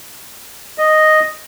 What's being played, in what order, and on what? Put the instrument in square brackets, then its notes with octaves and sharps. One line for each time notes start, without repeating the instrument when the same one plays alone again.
[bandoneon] D#5